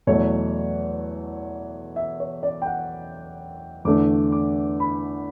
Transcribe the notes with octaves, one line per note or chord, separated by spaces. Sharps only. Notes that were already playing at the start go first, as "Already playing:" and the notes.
E2 B2 F#3 A3 C#5
E5
C#5
D5
G5
F#5
E2 D3 A3 D6
D6
B5